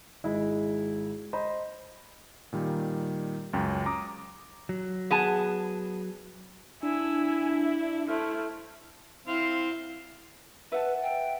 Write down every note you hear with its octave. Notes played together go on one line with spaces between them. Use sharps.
G#1 G#3 E4 D#5
C5 D#5 A#5 B5
A#2 D#3 G3
C#2 F#2 G5
A#5 D6 D#6
F#3
B3 G#4 A5
D4 E4 G#5 E6
E5
A3 E4 C5 F6
C4 E4 F5 C6
B4 E5 F#5 A5
G5